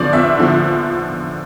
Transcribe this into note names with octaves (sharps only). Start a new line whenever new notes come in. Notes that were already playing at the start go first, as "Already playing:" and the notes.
Already playing: E2 D3 F3 D5
E2 E5
D3 F3